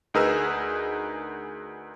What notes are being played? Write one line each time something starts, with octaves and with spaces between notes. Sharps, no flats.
D2 D#4 G#4 A#4 B4 E6